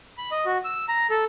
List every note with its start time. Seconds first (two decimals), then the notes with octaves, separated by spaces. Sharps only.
0.18 B5
0.31 D#5
0.45 F#4
0.64 E6
0.88 A#5
1.10 A4